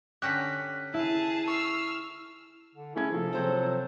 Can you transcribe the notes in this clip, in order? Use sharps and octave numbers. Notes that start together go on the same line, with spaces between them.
D3 C#4 G4 F#6 A#6 B6
E4 G#4 A5
C#6 E6 F6 C7
D3
A3 C#4 E4 G#4 G#6
C3 F3 A#3 A4
C3 F3 F#3 C4 C5